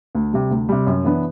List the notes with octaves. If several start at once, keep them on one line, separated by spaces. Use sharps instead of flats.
D2
C3 G3
D2
C3 G3
F#2
E3 B3 D4